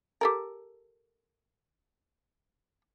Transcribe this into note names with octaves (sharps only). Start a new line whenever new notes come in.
G4 A4 A#4